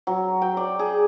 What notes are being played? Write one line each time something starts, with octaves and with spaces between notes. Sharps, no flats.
F#3
G5
D5
G#4